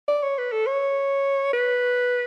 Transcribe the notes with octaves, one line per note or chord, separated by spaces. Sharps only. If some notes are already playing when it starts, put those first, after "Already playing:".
D5
C#5
B4
A4
C#5
B4